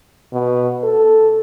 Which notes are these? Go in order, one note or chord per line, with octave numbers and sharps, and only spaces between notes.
B2
A4